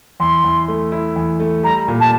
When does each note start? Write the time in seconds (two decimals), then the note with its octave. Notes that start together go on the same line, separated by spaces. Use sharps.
0.20 E2 C6
0.44 E2
0.68 A3
0.92 E4
1.16 E2
1.40 A3
1.63 G3 A#5
1.88 A#2
2.00 A5